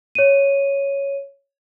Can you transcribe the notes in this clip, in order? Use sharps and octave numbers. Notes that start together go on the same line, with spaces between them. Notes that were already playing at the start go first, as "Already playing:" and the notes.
C#5 D#7